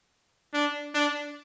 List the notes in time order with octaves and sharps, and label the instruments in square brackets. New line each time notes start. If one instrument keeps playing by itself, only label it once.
[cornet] D4
D4